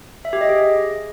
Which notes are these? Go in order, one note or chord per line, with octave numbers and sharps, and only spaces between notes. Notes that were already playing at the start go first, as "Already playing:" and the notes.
E5
G4
D#5
G#4